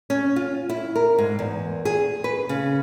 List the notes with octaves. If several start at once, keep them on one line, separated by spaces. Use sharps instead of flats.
C#4
F4
E4
A#4
G#2
E2
G#4
B4
C#3